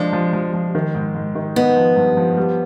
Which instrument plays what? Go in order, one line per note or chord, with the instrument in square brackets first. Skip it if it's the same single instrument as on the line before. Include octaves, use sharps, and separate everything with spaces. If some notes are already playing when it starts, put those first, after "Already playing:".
Already playing: [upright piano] F3 D4 [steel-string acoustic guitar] G#3
[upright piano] F3
F3
F3
D#3
G#2
G#2
D#3
[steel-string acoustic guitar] B3 [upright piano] D#4
[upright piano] F3
G2
F3
G3